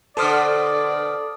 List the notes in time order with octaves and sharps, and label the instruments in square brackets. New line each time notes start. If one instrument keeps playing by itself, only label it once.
[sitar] B2 D3 [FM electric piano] A4 C5 F6 [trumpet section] D5 [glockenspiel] A5 D#6